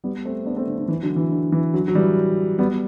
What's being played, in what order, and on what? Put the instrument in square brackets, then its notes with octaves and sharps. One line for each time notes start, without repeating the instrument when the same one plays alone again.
[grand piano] G3 B3
A3 C4
B3 D4
A3 C4
D3
D3
E3
D3 F#3
E3
D3
E3
D3 F#3
F#3
E3 G3
G3 B3